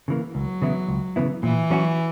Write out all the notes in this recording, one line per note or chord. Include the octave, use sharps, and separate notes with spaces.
C#3 E3 A#3
C#2 F#3
C#3 E3 B3 E4
C#2
C#3 E3 B3 E4
A#2 E3
F#3 C#4 F#4